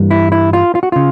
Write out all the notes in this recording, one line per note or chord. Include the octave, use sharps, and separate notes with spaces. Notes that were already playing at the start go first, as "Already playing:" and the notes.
Already playing: G2 E3 G3 A#3
E4
E4
F4
F4
F#4
C#3 F4